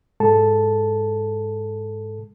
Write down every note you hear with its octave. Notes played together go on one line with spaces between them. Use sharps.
G#2 G#3 A4 A5